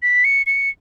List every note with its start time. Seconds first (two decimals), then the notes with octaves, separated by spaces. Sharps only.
0.03 B6
0.24 C#7
0.46 C#7